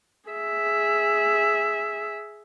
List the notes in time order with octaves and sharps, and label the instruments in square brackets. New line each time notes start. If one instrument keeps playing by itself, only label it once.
[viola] G#4 E5